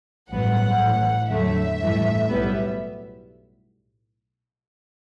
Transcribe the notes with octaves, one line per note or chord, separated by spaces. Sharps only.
A1 G2 F#3 B3 F#5
A1 A2 E3
E2 D3 F#3 A3 E5
A1 G2 E3 A3
B1 A2 G3 B3